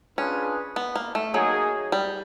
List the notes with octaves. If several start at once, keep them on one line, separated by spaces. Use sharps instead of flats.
C#4 D4 F4 G#4 B4
B3
A#3
A3
F#3 A#3 D#4 G#4
G3